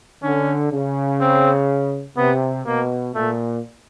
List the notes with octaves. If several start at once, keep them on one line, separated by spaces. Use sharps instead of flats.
D3 C#4
C#3
C4
C3 B3
B2 A#3
A#2 A3